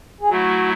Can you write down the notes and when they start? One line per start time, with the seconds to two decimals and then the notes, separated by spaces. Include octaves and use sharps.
0.21 G#4
0.30 F#3 A3 E4 F#4